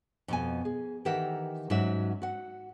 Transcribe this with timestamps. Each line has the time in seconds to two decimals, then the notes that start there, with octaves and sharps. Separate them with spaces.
0.28 F2 B2 G#5
0.65 G#4
1.05 D#3 E3 G4 A#4 E5 F#5
1.70 G#2 F#3 C#4 F#4 E5
2.22 F#4 F#5